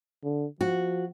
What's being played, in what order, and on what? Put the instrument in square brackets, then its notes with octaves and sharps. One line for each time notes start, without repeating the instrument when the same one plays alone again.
[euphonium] D3
[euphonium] F3 [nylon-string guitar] F#4